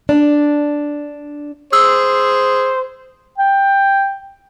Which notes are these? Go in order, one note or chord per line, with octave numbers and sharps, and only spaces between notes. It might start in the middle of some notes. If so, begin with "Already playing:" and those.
D4
G#4 C5 E6
G5